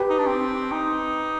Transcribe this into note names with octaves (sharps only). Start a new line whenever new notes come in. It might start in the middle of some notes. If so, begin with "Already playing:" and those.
Already playing: G4 B4
D#4
D4
C4
D#4